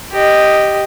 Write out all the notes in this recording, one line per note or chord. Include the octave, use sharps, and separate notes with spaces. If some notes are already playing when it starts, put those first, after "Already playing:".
G4 D#5